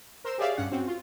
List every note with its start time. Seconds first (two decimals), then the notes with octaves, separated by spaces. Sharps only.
0.24 A#4 C5 C6 E6
0.38 G4 G#4 C#5 D5 E5 F5
0.57 G2 C#4 F#5
0.71 C4 C#4 F#4
0.88 F4